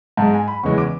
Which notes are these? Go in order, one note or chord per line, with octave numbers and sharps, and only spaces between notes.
G#2 G#3 A5
G#5
B5
E2 C#3 E3 G#3 C#6
D6